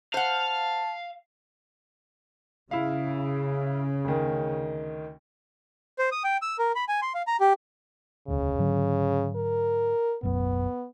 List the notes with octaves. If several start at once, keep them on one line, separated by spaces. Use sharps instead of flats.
C5 F5 F#5 A5
C#3 E4 F5
D2 D#3
C5
D#6
G5
E6
A#4
B5
G#5
C6
F5
A#5
G4
E1 D2 C#3
G#2 D3 F#3
A#4
F#1 B1 F#2 B3